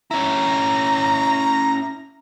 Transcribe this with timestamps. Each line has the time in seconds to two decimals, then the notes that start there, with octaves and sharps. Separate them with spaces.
0.11 C#4 E4 A#5